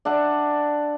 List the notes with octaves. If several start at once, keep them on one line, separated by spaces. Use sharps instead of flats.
D4 E5 F#5